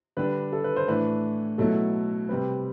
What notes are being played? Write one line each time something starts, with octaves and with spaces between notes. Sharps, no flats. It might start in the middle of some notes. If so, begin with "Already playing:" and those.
D3 G3 D4 B4
A4
B4
C5
A2 E3 A3 D4 B4
B2 F#3 A3 E4 A4
C3 G3 C4 B4